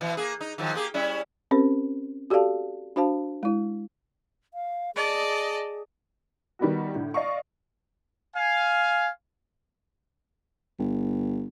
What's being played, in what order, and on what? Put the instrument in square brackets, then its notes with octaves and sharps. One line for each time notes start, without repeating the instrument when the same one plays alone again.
[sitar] B2 E3
A#3 G#4
D#4
D#3 F3 F#3
A#3 G4 G#4
G3 C#4 E4
[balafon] C4 C#4 G4 A#4 C5
F#4 G4 A4 D5 F5 A5
D4 F#4 C5 F5 A5
G#3 E4
[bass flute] F5
[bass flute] G#4 [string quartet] D5 D#5 A5
[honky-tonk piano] D#3 G3 B3 F#4
A2 D3
D5 D#5 F5 C#6
[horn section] F5 G#5
[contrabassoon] G1